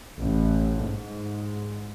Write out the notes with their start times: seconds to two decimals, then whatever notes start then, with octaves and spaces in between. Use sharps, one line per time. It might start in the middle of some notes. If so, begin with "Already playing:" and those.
0.19 A1
0.83 G#2